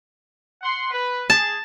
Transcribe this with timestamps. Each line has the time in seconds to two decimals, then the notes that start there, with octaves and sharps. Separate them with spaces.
0.62 F#5 C6
0.91 B4
1.30 G#4 A5